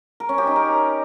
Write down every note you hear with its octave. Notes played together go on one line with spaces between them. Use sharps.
A#4
C#4
G4
D#4
A#4